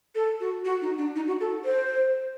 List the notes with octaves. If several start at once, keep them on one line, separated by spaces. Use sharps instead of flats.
A4
F#4
F#4
D#4
D4
D#4
F#4
A4
C5